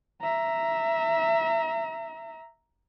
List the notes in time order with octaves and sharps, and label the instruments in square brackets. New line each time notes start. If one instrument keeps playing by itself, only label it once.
[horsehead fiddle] E5 A#5